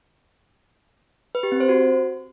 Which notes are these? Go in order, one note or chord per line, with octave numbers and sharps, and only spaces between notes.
B4
G4
C4
C5
F#4